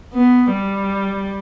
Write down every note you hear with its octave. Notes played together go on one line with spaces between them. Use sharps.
B3
G3